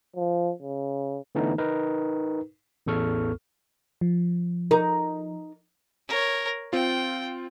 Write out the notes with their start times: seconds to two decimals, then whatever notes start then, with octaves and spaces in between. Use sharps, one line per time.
0.16 F3
0.62 C#3
1.35 D3 E3 A3 B3 D4 D#4
1.58 D#4 A#4 B4
2.86 A1 E2 A4 C#6 F6
4.01 F3
4.71 D#4 A#4
6.08 A#4 C#5
6.73 C4 F4 G5